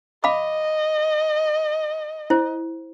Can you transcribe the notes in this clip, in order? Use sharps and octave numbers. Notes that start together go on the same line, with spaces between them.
D#5 F5 B5 D6
E4 C5